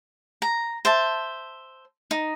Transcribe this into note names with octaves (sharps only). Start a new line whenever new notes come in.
A#5
C5 E5 A5
D#4